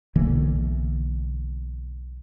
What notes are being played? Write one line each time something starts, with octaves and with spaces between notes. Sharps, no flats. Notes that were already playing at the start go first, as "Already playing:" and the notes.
B1 D3 E3 A#3